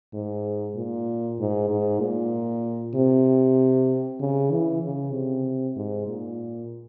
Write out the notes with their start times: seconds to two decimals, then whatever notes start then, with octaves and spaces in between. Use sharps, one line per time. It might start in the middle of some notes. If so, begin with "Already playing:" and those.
0.14 G#2
0.75 A#2
1.39 G#2
1.69 G#2
2.00 A#2
2.95 C3
4.20 C#3
4.51 E3
4.82 C#3
5.13 C3
5.76 G#2
6.07 A#2